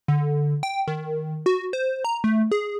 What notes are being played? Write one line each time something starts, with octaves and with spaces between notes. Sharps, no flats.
D3
G5
D#3
F#4
C5
A#5
A3
G#4